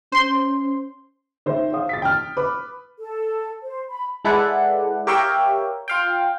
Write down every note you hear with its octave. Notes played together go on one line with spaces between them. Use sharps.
C#4 C5 C6
D#3 C5 C#5 E5
C#5 F5 D#6
A6 B6
G5 F6
B4 D6
A4
C5
B5
G#3 E4 A4 B4 D5 F#5
G4 A#4 C#5 E5 F5 G5
F4 F5 G5